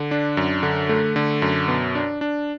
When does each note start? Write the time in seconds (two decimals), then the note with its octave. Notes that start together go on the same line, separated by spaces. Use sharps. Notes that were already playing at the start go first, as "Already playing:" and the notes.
Already playing: D3
0.11 D4
0.37 F#2
0.63 D3
0.89 A3
1.16 D3
1.42 F#2
1.68 B2
1.95 D4
2.21 D4